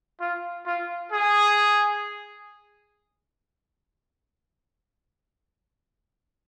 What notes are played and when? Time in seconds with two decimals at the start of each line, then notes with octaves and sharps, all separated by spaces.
0.20 F4
0.66 F4
1.12 G#4